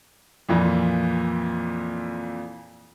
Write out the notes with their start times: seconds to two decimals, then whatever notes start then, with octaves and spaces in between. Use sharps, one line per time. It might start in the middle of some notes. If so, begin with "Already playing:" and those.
0.49 F2 A#2 E3